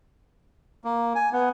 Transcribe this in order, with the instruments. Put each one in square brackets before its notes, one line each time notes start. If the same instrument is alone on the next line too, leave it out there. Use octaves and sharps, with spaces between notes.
[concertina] A#3
G#5
B3